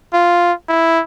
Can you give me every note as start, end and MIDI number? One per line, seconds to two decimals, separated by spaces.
0.13 0.53 65
0.69 1.02 64